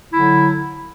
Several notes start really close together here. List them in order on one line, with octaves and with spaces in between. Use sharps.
E4 D3 F#3